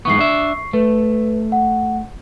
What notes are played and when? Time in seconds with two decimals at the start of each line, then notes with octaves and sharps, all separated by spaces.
0.05 G#2 E3 B3 C#6 C7
0.19 D4 E5
0.73 A3 B4
1.52 F#5